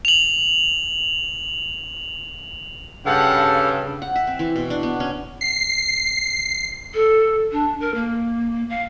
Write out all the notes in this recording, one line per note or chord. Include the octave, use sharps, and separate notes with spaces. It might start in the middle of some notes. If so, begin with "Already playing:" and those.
F7 F#7
G2 C#3 A4 F5 F#5
F#5
E5
C4
E3
B2
D4
B3
C#4
C7
A4
D4
A#4
A#3
F5